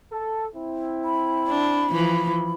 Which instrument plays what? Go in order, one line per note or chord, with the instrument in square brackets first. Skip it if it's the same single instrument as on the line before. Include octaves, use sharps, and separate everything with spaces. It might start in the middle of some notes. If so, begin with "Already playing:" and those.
[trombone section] A4
C4 E4
[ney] B5
[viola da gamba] D4
E3 F3